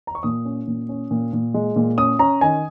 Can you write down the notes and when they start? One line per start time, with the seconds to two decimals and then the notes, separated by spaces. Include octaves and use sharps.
0.07 A#5
0.15 C#6
0.23 A#2 D#6
0.45 C#4
0.67 A#2
0.89 C#4
1.11 A#2
1.33 A#2
1.54 G#3
1.76 A#2
1.98 C#4 D#6
2.19 C#4 A#5
2.41 D#3 G#5